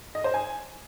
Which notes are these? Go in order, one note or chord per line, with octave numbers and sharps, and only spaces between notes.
D#5
C5
G#5